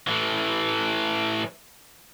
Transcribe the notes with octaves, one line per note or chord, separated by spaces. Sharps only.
A2 E3